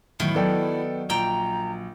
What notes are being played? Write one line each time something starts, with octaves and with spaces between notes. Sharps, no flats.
A2 D#3 E3 F#3 B3 E4
F#3 B3 A4 D5 G5
A#1 G5 A#5